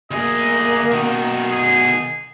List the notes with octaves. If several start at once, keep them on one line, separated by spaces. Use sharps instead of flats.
D2 A#3 G#4 D#5
B2 D#3
G#4